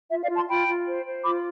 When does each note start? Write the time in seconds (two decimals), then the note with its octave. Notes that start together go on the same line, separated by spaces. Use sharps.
0.10 F4 E5
0.23 D5 F5
0.30 F4
0.36 A5 C6
0.49 F4 G5 B5
0.68 F4
0.86 C5
1.05 C5
1.24 F4 B5 D6